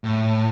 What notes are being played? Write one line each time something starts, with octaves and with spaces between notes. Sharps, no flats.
A2